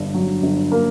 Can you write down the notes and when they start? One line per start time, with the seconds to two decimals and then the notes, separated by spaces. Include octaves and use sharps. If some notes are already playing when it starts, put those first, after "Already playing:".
Already playing: G1 G2
0.14 F#3
0.43 G1
0.72 A#3